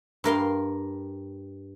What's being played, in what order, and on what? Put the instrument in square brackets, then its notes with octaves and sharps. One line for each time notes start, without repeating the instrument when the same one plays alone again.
[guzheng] G2 A#4 F5 C6